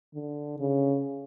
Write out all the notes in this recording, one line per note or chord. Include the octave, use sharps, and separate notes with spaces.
D3
C#3